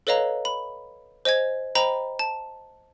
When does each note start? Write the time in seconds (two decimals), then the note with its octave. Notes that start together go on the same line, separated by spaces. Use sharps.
0.07 A4 B4 C#5 D#5 F5 A#5
0.45 B5
1.25 C5 D#5 G#5 G#6
1.75 C5 D#5 G5 A#5 B5
2.19 A5